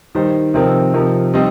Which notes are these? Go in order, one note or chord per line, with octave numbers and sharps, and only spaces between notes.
D#3 G3 D#4 C5
C3 F3 C4 D#4 A#4
C3 F3 D#4 A#4
G3 C4 D#4 C5 D#5